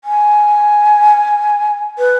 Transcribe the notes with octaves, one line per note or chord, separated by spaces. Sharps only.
G#5
B4